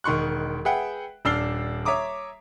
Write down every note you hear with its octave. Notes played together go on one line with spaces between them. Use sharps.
E1 D#3 C6 C#6 F#6
G#4 B4 E5 F#5 G5
D#1 D4 E6 F6 C7 G7
C#5 E5 A#5 D6 D#6